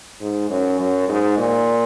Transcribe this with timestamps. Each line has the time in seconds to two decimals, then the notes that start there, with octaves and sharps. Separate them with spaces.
0.21 G#2
0.50 F#2
0.79 F#2
1.08 G#2
1.38 A#2